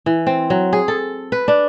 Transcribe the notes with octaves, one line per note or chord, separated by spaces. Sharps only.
E3
C4
F#3
G#4
A4
B4
D4